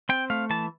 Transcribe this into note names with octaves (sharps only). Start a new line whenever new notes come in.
C4 G5
A3 F5
E3 A5